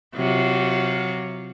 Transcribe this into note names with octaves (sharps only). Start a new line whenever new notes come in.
C3 F#3 F4